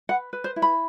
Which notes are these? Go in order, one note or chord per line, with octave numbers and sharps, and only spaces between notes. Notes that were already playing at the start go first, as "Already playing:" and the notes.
B4 F#5
B4
C5
E4
B5